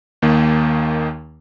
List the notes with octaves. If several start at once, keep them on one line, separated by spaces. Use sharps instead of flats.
D#2 D#3 A#3